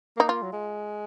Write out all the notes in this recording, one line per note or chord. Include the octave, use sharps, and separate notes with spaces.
A#3 D#4
F4
F#3
G#3